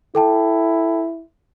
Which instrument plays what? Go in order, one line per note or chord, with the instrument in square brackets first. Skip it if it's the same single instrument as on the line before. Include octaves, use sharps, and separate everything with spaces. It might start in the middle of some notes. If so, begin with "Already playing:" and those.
[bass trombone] E4 [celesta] A4 G5 A5